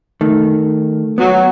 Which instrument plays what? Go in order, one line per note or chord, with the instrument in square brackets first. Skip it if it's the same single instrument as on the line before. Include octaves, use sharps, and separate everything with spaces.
[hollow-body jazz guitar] D#3 [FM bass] A3
[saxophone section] F#3 [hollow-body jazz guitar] B3